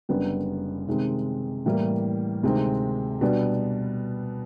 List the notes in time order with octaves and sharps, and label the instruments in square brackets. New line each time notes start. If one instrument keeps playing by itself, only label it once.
[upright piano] F#1 F#2 D3 G3 B3
C3 D#3 G#3 C4
A2 E3 G3 A#3
D2 C3 D#3 G#3 C4
B2 G3 B3 D4